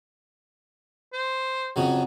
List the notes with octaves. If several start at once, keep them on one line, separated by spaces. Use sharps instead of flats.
C5
F2 C#3 F#3